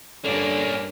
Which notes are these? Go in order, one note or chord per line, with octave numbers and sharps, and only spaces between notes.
G2 D3 A#3 C#4 D4 A#4